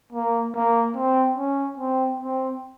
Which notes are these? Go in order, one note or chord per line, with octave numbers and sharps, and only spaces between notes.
A#3
A#3
C4
C#4
C4
C4